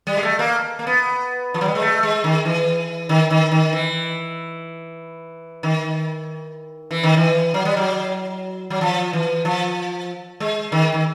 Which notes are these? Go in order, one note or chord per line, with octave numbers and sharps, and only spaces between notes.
G3
G#3
A3
A#3
A#3
B3
F3
F#3
G3
G#3
A3
G#3
D#3
E3
D#3
D#3
D#3
E3
D#3
E3
D#3
E3
F#3
G3
F#3
F#3
F3
E3
F3
G#3
D#3
D#3